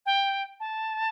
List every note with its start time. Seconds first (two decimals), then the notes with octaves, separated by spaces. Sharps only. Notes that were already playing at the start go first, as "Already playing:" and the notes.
0.06 G5
0.60 A5